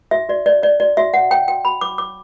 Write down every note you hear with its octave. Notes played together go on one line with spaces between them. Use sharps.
F#4 E5
F#4 D5
C#5 D5
C#5 D5
F#4 D5
F#4 E5
C#5 F#5
C#5 G5
F#4 G5
F#4 B5
C#5 D6
C#5 D6